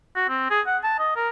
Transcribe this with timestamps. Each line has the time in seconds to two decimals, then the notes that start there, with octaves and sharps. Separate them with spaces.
0.16 F#4
0.29 C4
0.51 G#4
0.67 F#5
0.84 A5
0.99 D#5
1.16 A#4